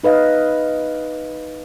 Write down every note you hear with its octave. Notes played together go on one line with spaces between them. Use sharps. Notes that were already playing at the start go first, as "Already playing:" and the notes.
D#4 B4 D#5 F5